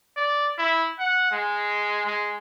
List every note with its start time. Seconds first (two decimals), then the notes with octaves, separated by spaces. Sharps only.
0.17 D5
0.58 E4
1.00 F#5
1.32 G#3
2.06 G#3